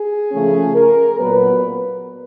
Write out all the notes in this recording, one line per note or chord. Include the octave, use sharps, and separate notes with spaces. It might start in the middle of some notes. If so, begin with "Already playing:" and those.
Already playing: G#4
C#3 F3 A3 C#4
A#4
A#2 F#3 B3 B4